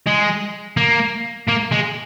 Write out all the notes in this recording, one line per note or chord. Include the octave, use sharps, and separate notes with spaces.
G#3
A#3
A#3
G#3